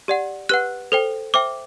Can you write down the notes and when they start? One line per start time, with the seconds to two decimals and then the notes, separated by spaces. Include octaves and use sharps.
0.08 G4 D5 F#5
0.49 G4 B4 F#5 F#6
0.92 A4 C5 G5
1.34 C5 E5 G5 D6